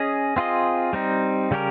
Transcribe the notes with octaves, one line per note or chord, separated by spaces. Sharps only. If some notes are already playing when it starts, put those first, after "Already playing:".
Already playing: C#4 G#4 D#5
C4 F4 G#4 D#5
G3 C4 D#4
C#3 G3 C#4 G4 A#4